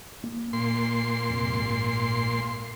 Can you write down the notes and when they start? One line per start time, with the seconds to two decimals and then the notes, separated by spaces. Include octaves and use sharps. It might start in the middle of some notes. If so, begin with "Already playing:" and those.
0.24 A#3
0.53 A#2 C6
1.30 F2 C3
1.51 A#1 G#2